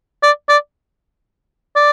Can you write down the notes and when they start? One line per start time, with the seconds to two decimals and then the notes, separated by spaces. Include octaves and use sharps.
0.23 D5
0.49 D5
1.76 D5